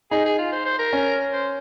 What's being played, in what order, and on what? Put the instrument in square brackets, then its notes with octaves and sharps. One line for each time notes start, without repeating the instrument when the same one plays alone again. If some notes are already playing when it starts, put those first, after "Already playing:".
[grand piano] D#4 [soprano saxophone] G#4
[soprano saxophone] G#4
F4
C5
C5
A#4
[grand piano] C#4
[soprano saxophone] C5